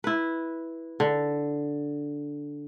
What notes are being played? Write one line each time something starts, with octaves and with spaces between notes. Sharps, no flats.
E4 B4
D3